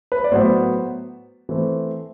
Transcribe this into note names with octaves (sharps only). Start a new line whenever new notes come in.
B4
D5
A2 F#3 B3 C5
E3 A3 C4